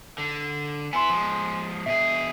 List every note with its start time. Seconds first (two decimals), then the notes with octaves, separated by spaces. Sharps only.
0.18 D3
0.93 B3 E4 G#5 C6
1.10 F3 G#3
1.86 B2 G#4 E5